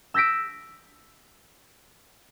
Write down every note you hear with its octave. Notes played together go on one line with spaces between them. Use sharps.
E6 G6 A#6 B6 D7